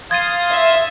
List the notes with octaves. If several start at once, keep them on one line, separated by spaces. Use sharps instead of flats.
F5 C6 D#6 G#6 A6 D#7
E5